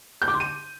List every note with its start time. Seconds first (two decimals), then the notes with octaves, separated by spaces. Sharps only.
0.22 G6
0.28 D6
0.34 C6
0.40 D#7